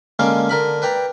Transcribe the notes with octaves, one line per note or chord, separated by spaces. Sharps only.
D3 G#3 A#3 C#4 F5 D6
D3 A#4 B5
B4 D5 G5 A#5